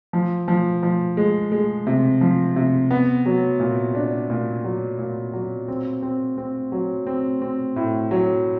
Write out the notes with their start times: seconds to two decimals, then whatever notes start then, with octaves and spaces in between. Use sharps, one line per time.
0.13 F3
0.48 F3
0.83 F3
1.17 G#3
1.52 G#3
1.87 C3
2.21 F3
2.56 C3
2.91 B3
3.26 F#3
3.60 A#2
3.95 D4
4.30 A#2
4.64 F#3
4.99 A#2
5.33 F#3
5.68 C4
6.03 C4
6.38 C4
6.72 F#3
7.07 C4
7.42 C4
7.76 A2
8.11 F#3